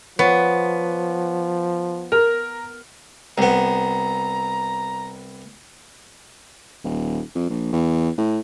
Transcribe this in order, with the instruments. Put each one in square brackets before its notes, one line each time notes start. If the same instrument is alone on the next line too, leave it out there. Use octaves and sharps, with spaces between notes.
[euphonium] F3 [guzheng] B3 [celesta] C#5 F#5 C#6
[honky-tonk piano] A#4 [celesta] F6 F7
[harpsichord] C2 B3 [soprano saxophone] A#5
[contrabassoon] D#1
F2
A#1
E2
A2